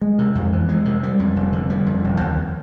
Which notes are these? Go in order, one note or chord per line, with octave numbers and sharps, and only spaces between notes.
G#3
C3
F2
E3
G#3
C3
G3
F2
F1
D3
G3
F2
E1
D#2